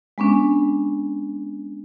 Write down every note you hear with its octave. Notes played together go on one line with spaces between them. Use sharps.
G#3 B3 C#4 D4